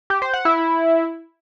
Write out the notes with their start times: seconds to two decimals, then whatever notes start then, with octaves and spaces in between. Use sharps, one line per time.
0.10 G4
0.22 C5
0.33 F#5
0.45 E4